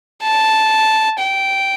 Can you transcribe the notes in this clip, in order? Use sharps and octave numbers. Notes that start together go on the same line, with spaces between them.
A5
G5